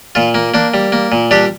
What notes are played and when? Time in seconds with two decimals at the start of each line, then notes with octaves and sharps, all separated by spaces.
0.15 A#2 F4
0.34 A#3
0.54 A#3 D4
0.74 G3
0.92 A#3
1.12 A#2
1.31 G3 D4 G4